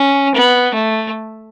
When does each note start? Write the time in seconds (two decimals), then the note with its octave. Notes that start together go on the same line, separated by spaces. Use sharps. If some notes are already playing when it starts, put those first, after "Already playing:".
Already playing: C#4
0.35 B3
0.74 A3